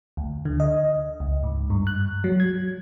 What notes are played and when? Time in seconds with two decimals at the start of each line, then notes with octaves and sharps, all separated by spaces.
0.17 D2
0.45 D3
0.60 D#5
1.20 C#2
1.43 G#2
1.70 G2
1.87 F#6
2.24 F#3
2.40 G#6